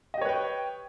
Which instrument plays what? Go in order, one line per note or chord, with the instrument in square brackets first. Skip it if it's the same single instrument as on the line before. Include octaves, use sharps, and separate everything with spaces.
[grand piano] D#5
G4
C#5
B4
G5